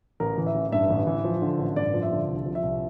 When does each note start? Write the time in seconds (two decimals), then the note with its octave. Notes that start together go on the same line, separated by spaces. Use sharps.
0.20 A1 A#4
0.38 E3
0.46 E5
0.55 A1
0.72 G2 E5
0.90 A1
1.07 E3
1.24 F3
1.42 D3
1.59 A1
1.76 G2 D5
1.94 F3
2.02 E5
2.11 D3
2.28 C2
2.46 F3
2.55 E5
2.63 C2